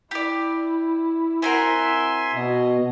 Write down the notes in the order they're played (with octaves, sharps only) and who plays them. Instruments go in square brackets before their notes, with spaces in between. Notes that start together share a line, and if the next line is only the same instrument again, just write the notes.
[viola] E4 [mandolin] G4 D5
[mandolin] C4 F#4 A#4 [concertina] E5 G#5 C6
[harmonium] B2 [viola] D#5